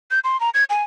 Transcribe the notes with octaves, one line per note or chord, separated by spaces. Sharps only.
G6
C6
A#5
G#6
G#5